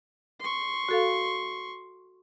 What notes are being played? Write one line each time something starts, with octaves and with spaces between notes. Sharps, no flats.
C6 C#6
F#4 A4 F5